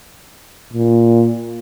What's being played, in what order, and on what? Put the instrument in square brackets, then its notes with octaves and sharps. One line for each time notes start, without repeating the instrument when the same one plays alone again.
[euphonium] A#2